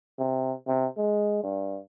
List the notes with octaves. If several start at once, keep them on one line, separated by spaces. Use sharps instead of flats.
C3
C3
G#3
G2